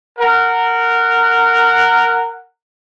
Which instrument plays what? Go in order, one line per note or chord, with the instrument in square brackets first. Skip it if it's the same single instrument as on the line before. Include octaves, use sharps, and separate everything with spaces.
[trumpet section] A#4 F#5